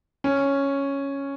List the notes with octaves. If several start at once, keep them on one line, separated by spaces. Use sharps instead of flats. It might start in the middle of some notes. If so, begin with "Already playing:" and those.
C#4